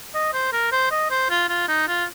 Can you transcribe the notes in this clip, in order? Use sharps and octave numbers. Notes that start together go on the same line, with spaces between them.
D#5
C5
A#4
C5
D#5
C5
F4
F4
D#4
F4